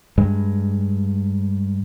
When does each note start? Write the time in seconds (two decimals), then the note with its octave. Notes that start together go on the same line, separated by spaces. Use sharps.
0.18 G2 G#3